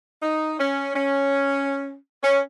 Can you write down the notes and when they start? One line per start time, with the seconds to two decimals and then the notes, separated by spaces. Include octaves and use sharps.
0.22 D#4
0.59 C#4
0.96 C#4
2.23 C#4